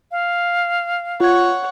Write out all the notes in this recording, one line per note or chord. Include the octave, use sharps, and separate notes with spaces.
F5
F4 C#5 F#5 G#6